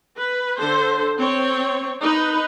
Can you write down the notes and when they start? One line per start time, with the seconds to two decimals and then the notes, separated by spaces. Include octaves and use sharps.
0.16 B4
0.58 D3 A4 C5
1.18 C4 C#5
2.00 D#4 B4